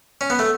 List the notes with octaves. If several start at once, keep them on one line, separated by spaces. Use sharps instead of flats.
C#4
B3
A3